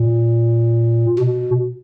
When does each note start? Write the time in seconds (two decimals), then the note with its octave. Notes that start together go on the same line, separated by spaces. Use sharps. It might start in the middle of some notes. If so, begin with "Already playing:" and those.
Already playing: A#2
1.19 B2